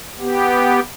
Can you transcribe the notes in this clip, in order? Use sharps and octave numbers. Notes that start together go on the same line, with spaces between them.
B3 G4